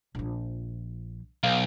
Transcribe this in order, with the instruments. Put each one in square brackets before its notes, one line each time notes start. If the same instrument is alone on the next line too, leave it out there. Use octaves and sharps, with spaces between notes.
[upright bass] A#1 F3
[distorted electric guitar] B1 [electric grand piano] F5